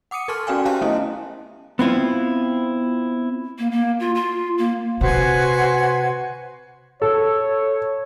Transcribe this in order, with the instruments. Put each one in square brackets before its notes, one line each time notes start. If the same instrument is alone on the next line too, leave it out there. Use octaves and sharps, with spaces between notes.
[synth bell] F#5 D6 D#6 C#7 D#7
A4 A#4 A5 C6 C#6 F6
C#4 F#4 D5 F5 G5 G#5
G4 C5 E5 F5 A5 F#6
A3 B3 C#4 E4 D#5
[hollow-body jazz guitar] B3 C4 E4 F4
[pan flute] A#3
A#3
F4
F4
A#3
[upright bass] C3 [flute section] F#4 C5 G#6 [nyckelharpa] B4 G#5
[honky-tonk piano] A4 [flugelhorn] C#5